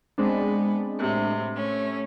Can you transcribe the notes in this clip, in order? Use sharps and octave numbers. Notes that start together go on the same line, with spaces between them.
G#3 B3 C4 D4
A2 C3
A3 C#4